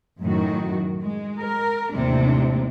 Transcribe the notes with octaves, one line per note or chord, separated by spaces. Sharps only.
F#2 A2 D#3 F#4
G#3
A#4
D#2 A2 C3 E3 G#3 D4